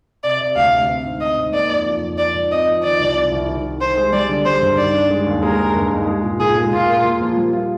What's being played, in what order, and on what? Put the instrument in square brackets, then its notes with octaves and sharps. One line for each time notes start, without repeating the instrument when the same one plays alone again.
[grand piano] C3 [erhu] D5
[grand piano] C3
[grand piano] D2 [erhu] F5
[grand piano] D2
C4
G#2
[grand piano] C4 [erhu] D#5
[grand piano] G#2
[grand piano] A#3 [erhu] D5
[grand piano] F2
F2
F2
[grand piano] F3 [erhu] D5
[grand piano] G#2
[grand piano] C4 [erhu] D#5
[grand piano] F3
[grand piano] D#3 [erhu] D5
[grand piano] C2
C3
C2
D#3
D#3
[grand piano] D#3 [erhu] C5
[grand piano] G#3
[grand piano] G3 [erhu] D5
[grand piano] D3
[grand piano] G3 [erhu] C5
[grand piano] G2
[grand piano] D#3 [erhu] D5
[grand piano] D4
G#3
D#2
[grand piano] G#3 [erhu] A#4
[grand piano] G#3
G2
D#4
G#3
A#2
[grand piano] A#2 [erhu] G#4
[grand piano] G#3
[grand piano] A#2 [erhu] F4
[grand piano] A#3
A#2
F3
G3
F4